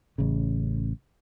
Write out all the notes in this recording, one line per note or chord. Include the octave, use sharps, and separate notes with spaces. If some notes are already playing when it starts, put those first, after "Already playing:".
A1 C#3